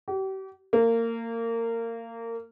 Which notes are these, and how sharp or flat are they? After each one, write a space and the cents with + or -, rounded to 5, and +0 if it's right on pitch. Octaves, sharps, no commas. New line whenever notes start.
G4 -40
A#3 -25